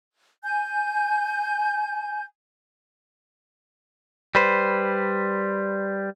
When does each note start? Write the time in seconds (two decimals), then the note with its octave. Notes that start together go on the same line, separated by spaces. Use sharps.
0.44 G#5 G6
4.35 G3 B4 C5